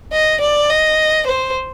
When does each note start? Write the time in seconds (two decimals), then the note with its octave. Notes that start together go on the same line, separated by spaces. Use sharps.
0.13 D#5
0.41 D5
0.70 D#5
1.27 C5